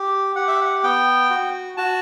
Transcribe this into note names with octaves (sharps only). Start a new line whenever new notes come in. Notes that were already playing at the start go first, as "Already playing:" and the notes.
Already playing: G4
G4 F#5
E5
F#5
B3 G5
F#4
F#4 A5